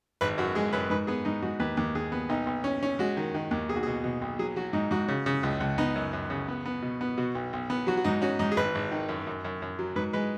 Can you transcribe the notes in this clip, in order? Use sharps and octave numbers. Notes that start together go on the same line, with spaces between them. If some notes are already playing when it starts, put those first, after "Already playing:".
G#1 B4
F#2 F#4
G#3 G#4
F#2 B4
G#2 B4
B3 G#4
G#2 D#4
G#2 F#4
D#2 B4
D#2
D#2 G#4
B3
B1 D#4
B1
C#4
C#4
G#3 F#4
D#3
D#3
D#2
B1 G#4
F#4
B2 G#4
B2
B1
F#3 G#4
F#3 F#4
G#2 D#4
G#2 F#4
C#3
C#3
C#2
C#2
B3 D#4
F#2
F#2
C#3
B3
B3
B2
B3
B2 F#4
B1
B1
B3
F#3 F#4
F#4
G#2 D#4
C#4 F#4
G#2 D#4
G#4
G#1 B4
G#1
D#3
F#2
F#2
F#2
F#2
F#3
G#2 B4
G#3 B4